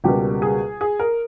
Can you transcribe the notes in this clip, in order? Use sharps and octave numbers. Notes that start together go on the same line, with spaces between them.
C#2 B2 G3 A#3 G4
G#4
G#4
A#4